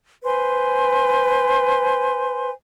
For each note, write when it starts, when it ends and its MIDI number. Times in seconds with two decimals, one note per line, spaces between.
0.23 2.51 71
0.23 2.51 72
0.23 2.51 80
0.23 2.51 84